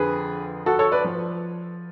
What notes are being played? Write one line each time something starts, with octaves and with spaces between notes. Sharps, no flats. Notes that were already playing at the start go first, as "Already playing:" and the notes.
Already playing: F2 D3 F3 G#4 B4
F#4 A4
A4 C#5
B4 D5
F3